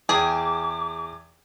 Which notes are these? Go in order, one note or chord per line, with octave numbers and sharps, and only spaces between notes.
E2 G#4 G5 D6